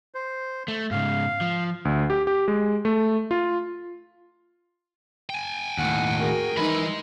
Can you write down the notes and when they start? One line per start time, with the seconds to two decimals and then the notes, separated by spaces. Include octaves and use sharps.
0.15 C5
0.68 A3
0.91 G#2 C#3 F5
1.41 F3
1.85 D2
2.10 G4
2.27 G4
2.48 G#3
2.85 A3
3.31 F4
5.30 G5 G#5
5.78 D#2 A2 F#5
6.20 F#4 G#4 A#4
6.57 E3 G3 G#3 D#4 B5